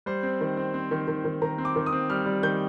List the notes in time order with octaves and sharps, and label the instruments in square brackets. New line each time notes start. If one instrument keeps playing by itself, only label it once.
[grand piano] G3 C5
C4
D#3
C4
C4
D#3
D#3
D#3
D#3 A#5
C4
D6
D#3
D#6
C4
G3 F6
G3
D#3 G6